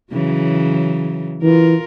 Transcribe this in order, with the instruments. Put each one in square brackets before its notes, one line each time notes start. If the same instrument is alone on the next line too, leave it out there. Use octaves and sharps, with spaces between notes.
[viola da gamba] C#3 E3 F#3
[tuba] E3 [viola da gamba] F4 A#4